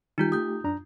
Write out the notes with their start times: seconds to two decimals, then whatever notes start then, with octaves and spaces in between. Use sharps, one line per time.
0.18 D#3 G3 D#4 F4 G4 G6
0.32 A3 G4 D#6 G6
0.64 F#2 D4 A#5